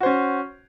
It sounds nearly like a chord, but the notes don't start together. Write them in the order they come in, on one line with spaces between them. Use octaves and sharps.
F#4 C5 C#4